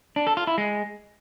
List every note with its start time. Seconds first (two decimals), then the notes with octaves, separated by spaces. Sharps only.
0.16 D4
0.27 A4
0.37 F4
0.47 E4
0.58 G#3